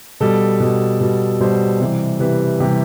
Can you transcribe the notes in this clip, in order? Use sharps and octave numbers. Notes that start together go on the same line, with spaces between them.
B2 G3 A4
B2 G3
B2 G3
B2 G3 C5
C3 E3 G3
C3 E3 G3 B4
C3 E3 G3 G4